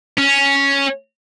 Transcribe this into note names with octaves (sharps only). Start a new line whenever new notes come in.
C#4